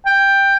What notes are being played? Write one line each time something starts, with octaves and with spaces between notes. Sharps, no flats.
G5